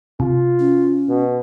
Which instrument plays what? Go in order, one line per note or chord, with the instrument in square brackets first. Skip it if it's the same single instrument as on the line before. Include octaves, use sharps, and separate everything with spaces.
[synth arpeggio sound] C3 [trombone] F4
[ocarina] C#4
[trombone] B2